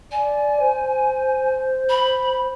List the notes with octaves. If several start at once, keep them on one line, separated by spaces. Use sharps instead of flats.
D5 G#5
C5
B5